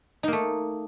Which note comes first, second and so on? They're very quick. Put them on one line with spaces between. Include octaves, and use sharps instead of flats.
D#4 A#3 A3